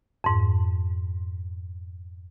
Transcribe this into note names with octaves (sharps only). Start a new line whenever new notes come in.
F2 G#2